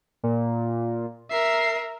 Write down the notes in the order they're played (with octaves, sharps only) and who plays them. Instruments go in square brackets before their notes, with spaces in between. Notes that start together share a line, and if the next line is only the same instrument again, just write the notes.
[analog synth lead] A#2
[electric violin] A#4 E5 [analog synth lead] C7